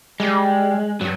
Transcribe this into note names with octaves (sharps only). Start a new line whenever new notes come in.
G3 G#3
G2 F#3